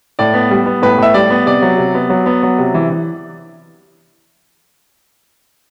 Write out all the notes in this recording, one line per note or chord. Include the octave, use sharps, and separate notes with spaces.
A2 D5
B3
G3
B3
A2 B4
A2 E5
G3 D5
B3
C3 D5
F#3
C3
B3
F#3
B3
F#3
C3
E3
E3